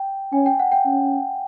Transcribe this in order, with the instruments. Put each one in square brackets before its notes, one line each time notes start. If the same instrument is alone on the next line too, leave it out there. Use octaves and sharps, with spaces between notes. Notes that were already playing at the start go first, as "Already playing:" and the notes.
Already playing: [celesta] G5
[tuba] C#4 [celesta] G#5
[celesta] G5
F#5
G5
[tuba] C#4